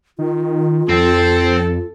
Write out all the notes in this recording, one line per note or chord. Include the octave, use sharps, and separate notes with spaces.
D#3 F4
F2 C4 A4